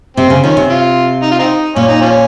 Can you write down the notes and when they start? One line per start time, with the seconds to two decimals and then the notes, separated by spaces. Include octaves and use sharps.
0.17 C3 C4
0.30 C#3
0.43 D#3 F3 C#4
0.57 C3
0.70 F4
1.23 D#4
1.31 F4
1.39 C4 D#4
1.76 A#2 C#4
1.89 D#4
2.01 F3 C#4